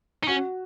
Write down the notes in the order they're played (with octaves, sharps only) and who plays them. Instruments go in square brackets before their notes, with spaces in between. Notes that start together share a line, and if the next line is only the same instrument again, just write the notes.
[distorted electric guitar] D#4
[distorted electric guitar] C#4 [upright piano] F#4